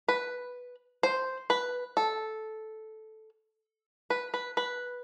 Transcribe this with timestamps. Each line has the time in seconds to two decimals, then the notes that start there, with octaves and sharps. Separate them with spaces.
0.08 B4
1.03 C5
1.50 B4
1.97 A4
4.10 B4
4.34 B4
4.57 B4